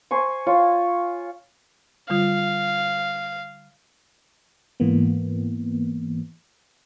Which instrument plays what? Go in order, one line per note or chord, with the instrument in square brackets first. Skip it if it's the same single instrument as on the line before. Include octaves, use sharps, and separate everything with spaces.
[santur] C5 G#5 C#6
F4 C#5
[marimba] D3 G3 F4 [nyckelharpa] F5
[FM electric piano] G#2 E3 A#3 B3